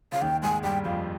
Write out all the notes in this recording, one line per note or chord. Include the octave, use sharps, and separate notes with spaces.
C#3 F5
D#2 D#3 G5
G#2 G#3 G#5
G2 G3 G5
F2 F3 F5